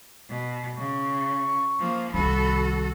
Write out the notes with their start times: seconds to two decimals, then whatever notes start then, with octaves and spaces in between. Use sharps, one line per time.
0.29 B2
0.78 C#3 C#6
1.80 F3 A#3
2.14 C2 D#3 F#4 A4 B5